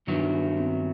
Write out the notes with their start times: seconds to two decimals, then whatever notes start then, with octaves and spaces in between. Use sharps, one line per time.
0.07 G2 D#3 F#3 B3 D4 E4
0.57 C4
0.73 C4